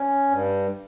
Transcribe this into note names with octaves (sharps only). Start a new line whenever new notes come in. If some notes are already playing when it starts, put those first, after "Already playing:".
Already playing: C#4
G2